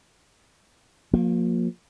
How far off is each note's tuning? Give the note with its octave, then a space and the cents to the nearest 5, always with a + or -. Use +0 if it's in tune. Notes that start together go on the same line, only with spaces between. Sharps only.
F3 +40 A#3 +0